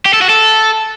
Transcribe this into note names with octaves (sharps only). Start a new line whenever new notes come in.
G4
A4
F#4
A4